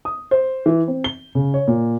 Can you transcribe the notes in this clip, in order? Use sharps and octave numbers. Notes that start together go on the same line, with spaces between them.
D#6
C5
E3
C4
G7
C#3
C#5
A#2